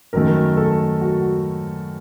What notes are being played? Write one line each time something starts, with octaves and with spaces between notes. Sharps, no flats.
F#2 D#3 A3 A#4
A4
F#4